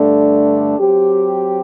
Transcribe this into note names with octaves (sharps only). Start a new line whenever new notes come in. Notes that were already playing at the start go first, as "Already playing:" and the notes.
Already playing: G2 D3 A3 D4
F#3 C4 G4